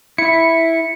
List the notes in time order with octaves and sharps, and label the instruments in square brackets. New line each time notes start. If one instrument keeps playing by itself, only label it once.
[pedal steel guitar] E4 [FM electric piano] C#7